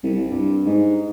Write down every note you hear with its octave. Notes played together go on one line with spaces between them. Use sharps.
C2
G2
G#2